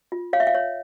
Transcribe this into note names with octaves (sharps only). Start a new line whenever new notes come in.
F4
C#5 F5
E5
F5
C#5